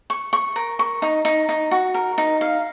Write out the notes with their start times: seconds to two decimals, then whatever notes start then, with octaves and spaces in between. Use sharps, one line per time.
0.10 C#6
0.33 C#6
0.56 A#4
0.79 C#6
1.02 D#4
1.25 D#4
1.49 D#4
1.71 F#4
1.94 A#4
2.18 D#4
2.41 F5